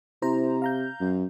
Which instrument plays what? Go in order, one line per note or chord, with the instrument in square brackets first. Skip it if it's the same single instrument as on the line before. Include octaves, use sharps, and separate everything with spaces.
[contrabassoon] C3 [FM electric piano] E4 C5 A#5
[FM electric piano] F5 A#5 G6
[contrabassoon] F#2